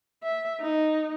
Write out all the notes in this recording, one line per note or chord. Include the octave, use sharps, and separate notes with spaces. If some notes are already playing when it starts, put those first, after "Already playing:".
E5
D#4